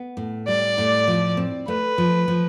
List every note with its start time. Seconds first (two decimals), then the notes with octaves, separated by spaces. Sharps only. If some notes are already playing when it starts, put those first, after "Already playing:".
Already playing: B3
0.17 A2
0.47 G3 D5
0.78 A2
1.08 F3
1.37 C4
1.68 A3 B4
1.98 F3
2.28 F3